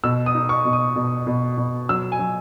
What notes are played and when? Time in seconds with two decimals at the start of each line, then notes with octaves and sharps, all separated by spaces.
0.04 B2 E6
0.26 D#6
0.35 D#4
0.49 C#6
0.65 B2
0.73 D#6
0.96 B2
1.27 B2
1.58 B2
1.89 F#3 E6
2.12 G#5
2.19 F#3